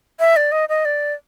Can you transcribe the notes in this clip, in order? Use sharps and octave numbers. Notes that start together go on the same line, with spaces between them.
E5
D5
D#5
D#5
D5